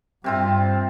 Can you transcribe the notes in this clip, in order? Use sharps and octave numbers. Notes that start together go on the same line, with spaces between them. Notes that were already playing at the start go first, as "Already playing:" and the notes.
G2 C3 C4 F4